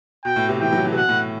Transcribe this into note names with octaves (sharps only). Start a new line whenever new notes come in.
B2 G5
A2
C3
E3 G5
F#3
E3
C3
B2 F#5
A2